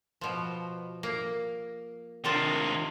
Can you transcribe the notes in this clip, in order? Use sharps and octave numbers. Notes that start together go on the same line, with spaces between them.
B2 F3
A#3
C3 D#3 D4 F4 A#4